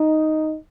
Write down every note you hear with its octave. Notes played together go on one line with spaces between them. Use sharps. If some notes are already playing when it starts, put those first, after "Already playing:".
Already playing: D#4